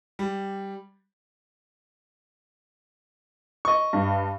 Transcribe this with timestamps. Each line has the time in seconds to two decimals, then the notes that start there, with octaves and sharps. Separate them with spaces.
0.19 G3
3.65 D#5 C#6
3.93 G2